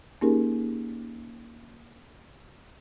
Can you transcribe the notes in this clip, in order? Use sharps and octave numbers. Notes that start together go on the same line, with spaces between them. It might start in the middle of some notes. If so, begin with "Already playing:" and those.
A#3 C#4 D#4 G4 G#4 A#4